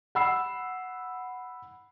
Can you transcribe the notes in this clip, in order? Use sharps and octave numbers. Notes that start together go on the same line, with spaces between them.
F#5 B5 E6 C7